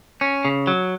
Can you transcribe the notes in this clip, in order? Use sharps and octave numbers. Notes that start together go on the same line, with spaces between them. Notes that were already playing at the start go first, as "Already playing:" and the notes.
C#4
C#3
F#3